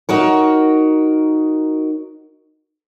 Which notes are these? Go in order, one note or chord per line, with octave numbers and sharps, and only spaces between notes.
D#4 F#4 A#4 C#5